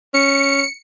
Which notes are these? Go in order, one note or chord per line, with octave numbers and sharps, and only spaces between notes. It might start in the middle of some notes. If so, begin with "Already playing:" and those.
C#4 C#7